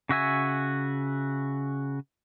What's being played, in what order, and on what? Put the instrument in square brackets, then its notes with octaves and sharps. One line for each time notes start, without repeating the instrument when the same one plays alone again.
[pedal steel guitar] C#3 F#4 E5 G#5